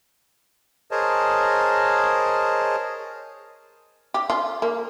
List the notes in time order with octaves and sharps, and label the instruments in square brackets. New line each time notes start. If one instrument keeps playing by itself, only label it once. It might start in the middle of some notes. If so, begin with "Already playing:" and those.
[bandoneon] G#4 A#4 C5 C#5 D#5 A5
[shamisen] G4
F4
A#3